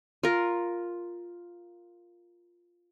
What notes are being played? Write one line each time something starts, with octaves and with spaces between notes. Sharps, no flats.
F4 A#4